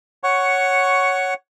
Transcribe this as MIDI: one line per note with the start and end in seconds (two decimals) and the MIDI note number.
0.24 1.34 73
0.24 1.34 78
0.24 1.34 85